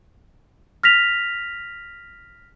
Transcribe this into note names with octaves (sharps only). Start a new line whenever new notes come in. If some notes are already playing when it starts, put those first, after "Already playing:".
F6 A#6 B6 F7